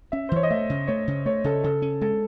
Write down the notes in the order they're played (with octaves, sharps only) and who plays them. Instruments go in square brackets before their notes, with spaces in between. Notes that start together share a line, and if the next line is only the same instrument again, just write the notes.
[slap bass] C#4 [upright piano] E5
[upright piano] C5
[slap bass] E3 [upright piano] C#5
[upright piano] D#5
[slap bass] A3 [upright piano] E5
[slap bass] C#3
[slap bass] A3 [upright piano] C#5
[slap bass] C#3
[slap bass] A3 [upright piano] C#5
[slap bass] C#3 [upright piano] A4
[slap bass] C#3 [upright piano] A4
[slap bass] C#4
[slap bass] G#3 [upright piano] A4